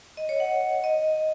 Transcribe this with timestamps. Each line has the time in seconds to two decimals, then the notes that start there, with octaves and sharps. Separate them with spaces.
0.17 D#5
0.29 C#5
0.40 F#5
0.84 D#5